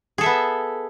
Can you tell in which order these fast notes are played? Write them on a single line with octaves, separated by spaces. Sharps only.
G#4 A4 E5 B3